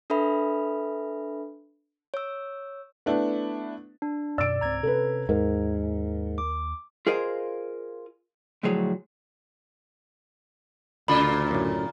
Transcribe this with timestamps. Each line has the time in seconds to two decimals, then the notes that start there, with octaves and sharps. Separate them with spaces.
0.10 D4 A4 B4 E5 B5
2.14 C#5 E6
3.06 A3 B3 D4 E4
4.02 D4
4.38 F#2 B2 D5 E6 D7
4.61 C#2 G#2 C4 A#5 G#6
4.83 C3 C#4 A4 B4
5.29 D#2 G#2 A#4
6.38 D6
7.07 F4 G#4 A#4 C5 D#5 F5
8.63 D2 A2 F3 F#3 G#4 C#5
11.08 D2 A#2 C#3 F4 B5
11.51 F#2 A2